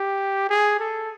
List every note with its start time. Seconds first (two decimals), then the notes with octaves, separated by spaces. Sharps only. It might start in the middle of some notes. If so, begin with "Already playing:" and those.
Already playing: G4
0.50 G#4
0.80 A4